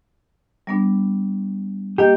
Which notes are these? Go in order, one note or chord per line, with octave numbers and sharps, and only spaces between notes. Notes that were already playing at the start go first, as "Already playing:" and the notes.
G3 B3 D4
A#3 G4 D#5 G6